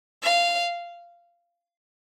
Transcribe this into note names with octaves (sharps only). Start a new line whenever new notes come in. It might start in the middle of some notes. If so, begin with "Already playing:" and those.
F5